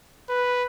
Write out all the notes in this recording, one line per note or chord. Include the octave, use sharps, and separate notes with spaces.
B4